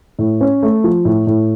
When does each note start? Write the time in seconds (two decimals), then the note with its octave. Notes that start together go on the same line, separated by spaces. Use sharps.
0.19 A2
0.41 C#4
0.63 A3
0.84 F3
1.05 A2
1.27 A2